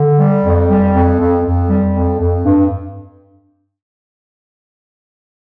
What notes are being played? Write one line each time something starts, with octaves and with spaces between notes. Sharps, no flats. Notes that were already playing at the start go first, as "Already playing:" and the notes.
Already playing: D3
G3
F2
G3
F2
F2
F2
G3
F2
F2
G2